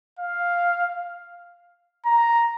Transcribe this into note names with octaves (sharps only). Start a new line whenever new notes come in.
F5
A#5